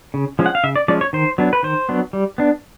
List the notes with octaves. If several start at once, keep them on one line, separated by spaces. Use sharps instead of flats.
C#3
F3 G#3 C#4
F#5
F5
C#3 E5
D5
F3 G#3 C#4 D5
C#5
D#3 C5
F#3 B3 D4
B4
D#3 C5
F#3 B3 D4
G3
B3 D4